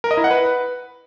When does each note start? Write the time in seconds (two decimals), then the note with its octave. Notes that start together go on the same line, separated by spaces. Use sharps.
0.04 A#4
0.11 D#5
0.17 E4
0.24 F#5
0.31 B4